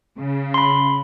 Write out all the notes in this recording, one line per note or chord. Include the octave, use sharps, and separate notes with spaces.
C#3
B5 C6